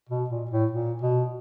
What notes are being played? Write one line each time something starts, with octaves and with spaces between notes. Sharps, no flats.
B2
A#2
A2
A#2
B2